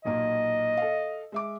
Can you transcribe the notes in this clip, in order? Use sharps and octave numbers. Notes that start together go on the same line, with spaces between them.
B1 A#2 A#3 D#5
A4 F5
G#3 E5 D6